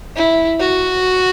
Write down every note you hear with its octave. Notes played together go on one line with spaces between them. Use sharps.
E4
F#4